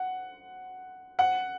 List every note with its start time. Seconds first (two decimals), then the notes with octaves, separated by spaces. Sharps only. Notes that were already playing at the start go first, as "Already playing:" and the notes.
Already playing: F#5
1.19 F#5